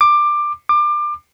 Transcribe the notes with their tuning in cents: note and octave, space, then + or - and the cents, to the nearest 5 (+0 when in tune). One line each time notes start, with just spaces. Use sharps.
D6 +15
D6 +25